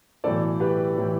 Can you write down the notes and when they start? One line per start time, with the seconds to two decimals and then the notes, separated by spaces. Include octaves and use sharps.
0.24 B1 A2 E3 A4 D5
0.60 G4 B4
0.97 A2 E3